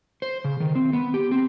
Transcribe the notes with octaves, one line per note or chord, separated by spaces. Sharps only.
C5
C#3
D#3
C4
B3
G4
C4